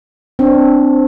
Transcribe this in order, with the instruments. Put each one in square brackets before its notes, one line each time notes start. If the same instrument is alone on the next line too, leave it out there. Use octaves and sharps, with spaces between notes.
[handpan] C4 D4